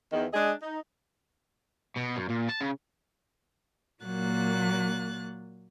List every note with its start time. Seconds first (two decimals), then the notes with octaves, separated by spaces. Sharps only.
0.12 E2 D#3
0.34 G#3 D4 G#4 D#5
0.62 D#4
1.97 B2
2.17 F#2
2.30 A#2
2.49 A5
2.61 C#3
4.04 A#2 F#3 A#3 F#6 A6